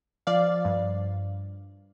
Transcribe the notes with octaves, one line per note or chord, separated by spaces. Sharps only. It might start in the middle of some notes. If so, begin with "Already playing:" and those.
F3 D5 F5
G2